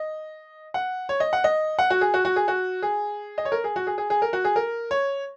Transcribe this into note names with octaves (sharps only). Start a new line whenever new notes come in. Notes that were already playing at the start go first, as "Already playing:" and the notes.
Already playing: D#5
F#5
C#5
D#5
F#5
D#5
F#5
F#4
G#4
F#4
F#4
G#4
F#4
G#4
D#5
C#5
A#4
G#4
F#4
G#4
G#4
G#4
A#4
F#4
G#4
A#4
C#5